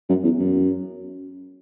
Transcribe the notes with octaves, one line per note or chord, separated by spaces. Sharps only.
F#2
E2
F#2